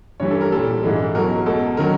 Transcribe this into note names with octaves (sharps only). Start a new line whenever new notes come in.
G2 E3 G3 C#5
A4
A#4
A#2 G3 A4
G#2 E3 G#3
B2 F#3 A#4
B2 G#3 A4
D#3 F#3 A#4